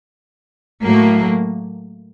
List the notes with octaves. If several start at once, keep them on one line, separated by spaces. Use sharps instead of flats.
A2 F#3 A#3